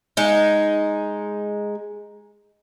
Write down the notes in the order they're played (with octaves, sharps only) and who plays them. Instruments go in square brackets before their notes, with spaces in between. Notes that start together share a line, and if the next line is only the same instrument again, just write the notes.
[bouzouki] G#3 D#4